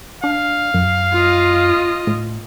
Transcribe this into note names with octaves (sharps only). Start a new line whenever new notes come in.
D4 F5
F#2
F4 D#5
A2